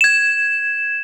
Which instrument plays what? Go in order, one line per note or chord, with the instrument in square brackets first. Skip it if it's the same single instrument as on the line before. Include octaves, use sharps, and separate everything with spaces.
[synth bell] G#6 E7